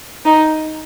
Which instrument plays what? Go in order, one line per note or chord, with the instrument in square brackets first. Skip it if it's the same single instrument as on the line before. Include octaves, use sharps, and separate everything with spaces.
[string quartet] D#4